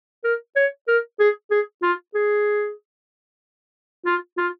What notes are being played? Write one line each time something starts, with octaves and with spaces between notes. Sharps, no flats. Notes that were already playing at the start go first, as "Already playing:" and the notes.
A#4
C#5
A#4
G#4
G#4
F4
G#4
F4
F4